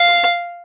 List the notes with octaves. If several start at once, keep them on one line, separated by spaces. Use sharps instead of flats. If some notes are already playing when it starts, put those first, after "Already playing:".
Already playing: F5